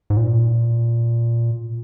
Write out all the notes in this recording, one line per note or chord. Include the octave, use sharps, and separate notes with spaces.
G#2
A#2